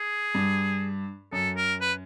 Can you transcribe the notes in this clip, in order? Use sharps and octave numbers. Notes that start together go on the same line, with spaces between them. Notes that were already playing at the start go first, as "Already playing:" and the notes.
Already playing: G#4
G2
F#2 A4
A#4
B4